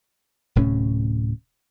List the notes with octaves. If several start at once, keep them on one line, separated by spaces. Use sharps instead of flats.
D1 A2 C3 C#4